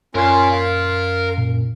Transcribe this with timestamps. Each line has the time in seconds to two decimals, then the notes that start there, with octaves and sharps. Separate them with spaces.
0.15 F#2 C#4 F4 A#4 C6
0.52 F5
1.38 A#2